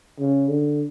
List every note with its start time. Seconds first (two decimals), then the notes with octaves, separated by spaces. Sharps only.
0.19 C#3
0.49 D3